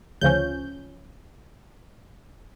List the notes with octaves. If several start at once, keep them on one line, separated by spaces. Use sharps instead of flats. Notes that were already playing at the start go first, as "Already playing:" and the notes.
D2 C#3 F3 C#4 G6